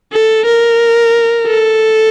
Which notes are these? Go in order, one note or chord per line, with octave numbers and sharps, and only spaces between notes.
A4
A#4
A4